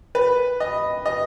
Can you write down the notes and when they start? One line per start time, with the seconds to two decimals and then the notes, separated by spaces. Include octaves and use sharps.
0.15 B4
0.60 D#5
1.06 D#5